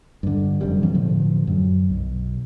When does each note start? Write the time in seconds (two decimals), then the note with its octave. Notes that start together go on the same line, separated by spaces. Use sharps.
0.23 G2 D3
0.61 F1 F#2 C3 G3
0.82 B2 E3 F#3 C4
0.94 A2 D3 F3 A3
1.47 F#2
1.90 B1